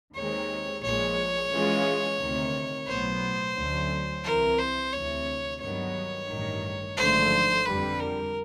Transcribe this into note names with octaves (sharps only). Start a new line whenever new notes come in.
D#2 D#3 G#3 C4 C#5
A#1 A#2 F3 G#3 C#5
E3 G#3 C#4 F4
D2 C3 D#3
B1 A2 F#3 B3 C5
D2 D3 F#3 A3 C#4
C2 C3 E3 A#4
C5
D2 C3 E3 C#5
G2 D#3 F#3 B3 C#5
A1 G2 D#3
G#1 F#2 D3 F3 A3 C5
F2 D3 G3 B4
A#4